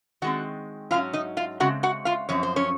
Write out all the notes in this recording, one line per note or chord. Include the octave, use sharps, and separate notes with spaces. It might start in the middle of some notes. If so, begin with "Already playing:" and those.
D#3 G#3 C4 F#4 F#5
G#2 F#3 C#4 F4 F5
D#4 D#5
F4 F5
C#3 G#3 C4 F#4 F#5
F#4 F#5
F4 F5
F#2 F3 C4 C#5
C5
C#4 C#5